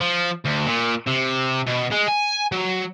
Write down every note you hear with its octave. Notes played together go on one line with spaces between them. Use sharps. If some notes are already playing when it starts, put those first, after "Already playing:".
F3
D2
A#2
C3
B2
G#3
G#5
F#3